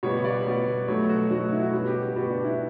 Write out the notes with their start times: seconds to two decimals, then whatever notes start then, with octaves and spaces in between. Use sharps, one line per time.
0.03 B2 G3 B3 C#5
0.24 D5
0.46 B2 G3 B3
0.88 B2 F#3 A3 C#5
1.09 F#4
1.31 B2 F#3 A3 F#4
1.52 E4
1.63 F#4
1.74 B2 G3 B3
1.87 G4
2.02 G4
2.16 B2 G3 B3 F#4
2.30 D4
2.44 E4